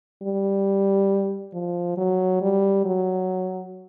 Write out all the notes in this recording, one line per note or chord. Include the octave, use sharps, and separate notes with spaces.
G3
F3
F#3
G3
F#3